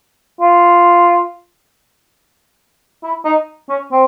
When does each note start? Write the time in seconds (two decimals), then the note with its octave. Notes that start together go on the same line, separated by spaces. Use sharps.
0.40 F4
3.04 E4
3.25 D#4
3.69 C#4
3.92 C4